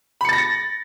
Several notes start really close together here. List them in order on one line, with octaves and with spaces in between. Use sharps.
B5 C#7 A6 A#6